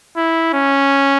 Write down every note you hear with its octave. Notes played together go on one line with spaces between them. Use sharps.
E4
C#4